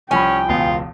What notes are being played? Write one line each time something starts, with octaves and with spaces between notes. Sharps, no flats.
C2 F3 C#4 G5 G#5 B5
E1 C#2 B3 F4